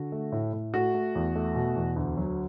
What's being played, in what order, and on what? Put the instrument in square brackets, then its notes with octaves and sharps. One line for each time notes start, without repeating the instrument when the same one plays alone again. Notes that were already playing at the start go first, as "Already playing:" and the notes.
Already playing: [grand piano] D3 F#4
A3
A2
A2
A3 F#4
A3
E2
A3
B2
E2
D2
F#3